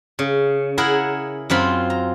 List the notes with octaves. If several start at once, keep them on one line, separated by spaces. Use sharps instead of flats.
C#3
E4 G#4 A#4 F#5
F#2 C4 F4 B5
A#5